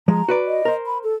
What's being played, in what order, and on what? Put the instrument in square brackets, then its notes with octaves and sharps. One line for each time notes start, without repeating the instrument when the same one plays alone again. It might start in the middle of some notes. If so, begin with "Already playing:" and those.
[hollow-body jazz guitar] F3 G#3 [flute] A#5
[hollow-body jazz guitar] F#4 B4 D5
[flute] D#5
[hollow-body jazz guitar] A#4 C5
[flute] B5
A4